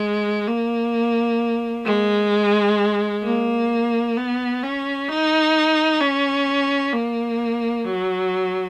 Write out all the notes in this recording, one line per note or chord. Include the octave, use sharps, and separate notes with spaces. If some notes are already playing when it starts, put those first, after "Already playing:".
Already playing: G#3
A#3
G#3
A#3
B3
C#4
D#4
C#4
A#3
F#3